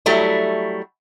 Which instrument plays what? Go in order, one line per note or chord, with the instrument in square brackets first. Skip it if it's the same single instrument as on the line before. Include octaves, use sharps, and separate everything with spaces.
[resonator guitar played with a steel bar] F#3 G3 A3 E4